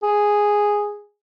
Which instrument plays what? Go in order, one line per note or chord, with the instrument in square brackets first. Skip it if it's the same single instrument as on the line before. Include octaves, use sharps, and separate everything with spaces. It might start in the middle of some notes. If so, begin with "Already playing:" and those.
[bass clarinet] G#4